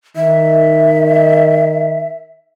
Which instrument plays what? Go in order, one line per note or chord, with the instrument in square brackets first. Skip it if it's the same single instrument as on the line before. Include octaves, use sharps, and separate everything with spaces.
[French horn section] D#3 [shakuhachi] E5